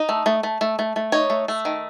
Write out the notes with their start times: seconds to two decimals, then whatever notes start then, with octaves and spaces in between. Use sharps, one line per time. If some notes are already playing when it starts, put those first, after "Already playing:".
Already playing: D#4
0.09 A3
0.26 A3
0.43 A3
0.61 A3
0.79 A3
0.96 A3
1.12 D#4 C#5
1.30 A3
1.48 A3
1.65 D#3